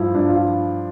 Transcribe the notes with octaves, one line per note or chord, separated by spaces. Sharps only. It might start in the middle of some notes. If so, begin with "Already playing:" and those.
Already playing: G2 F3 E4
G2 D4
F4
F3